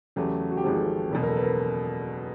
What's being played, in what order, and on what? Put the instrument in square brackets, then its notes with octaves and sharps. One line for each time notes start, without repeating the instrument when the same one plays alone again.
[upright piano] E2 C#3 F#3 A3 [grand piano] G4
[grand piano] F#4
G4
[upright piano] G#1 G#2 F3 G#3 C4 [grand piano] G#4
[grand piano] A4
[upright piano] F#1 E2 B2 [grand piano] A4
[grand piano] A#4
A4
B4
A#4